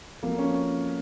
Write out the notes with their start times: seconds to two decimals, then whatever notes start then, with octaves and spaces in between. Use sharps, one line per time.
0.23 F3 A#3 C4 F4 A4
0.38 C#4